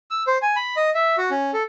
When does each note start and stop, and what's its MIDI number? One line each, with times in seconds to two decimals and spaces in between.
0.11 0.23 88
0.27 0.38 72
0.42 0.56 80
0.56 0.76 83
0.76 0.90 75
0.95 1.16 76
1.18 1.30 66
1.31 1.51 61
1.54 1.63 69